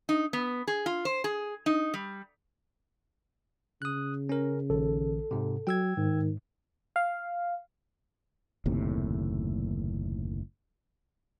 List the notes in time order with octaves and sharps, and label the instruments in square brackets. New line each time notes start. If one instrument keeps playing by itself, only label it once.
[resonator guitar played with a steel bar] D#4
B3
G#4
F4
C5
G#4
D#4
G3
[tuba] C#3 [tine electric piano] D#6 F#6
[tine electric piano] C#4 A#4
[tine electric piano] A#1 D#3 [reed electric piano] A4
[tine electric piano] G#2 C3
[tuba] F#3 [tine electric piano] G5 E6 G#6
[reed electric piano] G#2 [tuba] D#3
[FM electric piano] F5
[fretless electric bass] F#1 D#2 A2 C3